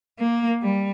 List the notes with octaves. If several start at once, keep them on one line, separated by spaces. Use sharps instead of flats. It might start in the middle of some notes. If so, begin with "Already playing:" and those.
A#3
G3